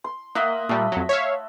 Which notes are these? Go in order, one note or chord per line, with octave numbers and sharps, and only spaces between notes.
C6
A#3 D#5 E5 F#5
A#2 G3 A3
F2 F#3
C#5 E5 F5